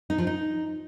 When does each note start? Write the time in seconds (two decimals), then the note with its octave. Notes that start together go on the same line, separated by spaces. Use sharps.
0.10 D#4
0.18 F3
0.27 D#4